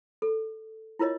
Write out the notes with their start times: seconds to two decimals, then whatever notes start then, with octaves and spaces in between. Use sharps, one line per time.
0.22 A4
0.99 E4 F4 A#4 C#5 D#5